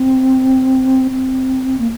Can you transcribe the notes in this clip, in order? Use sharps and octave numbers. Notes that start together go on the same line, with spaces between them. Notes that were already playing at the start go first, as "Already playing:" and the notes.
Already playing: C4
C4
A#3